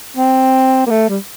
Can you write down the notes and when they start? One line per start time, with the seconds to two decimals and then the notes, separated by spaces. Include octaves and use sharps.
0.17 C4
0.86 A#3
0.90 A3
1.09 G3